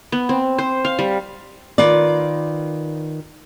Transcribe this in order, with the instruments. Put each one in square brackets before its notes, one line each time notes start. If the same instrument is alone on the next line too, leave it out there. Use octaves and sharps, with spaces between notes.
[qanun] B3
C4
C5
F5
G3
[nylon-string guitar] D#3 F4 B4 D5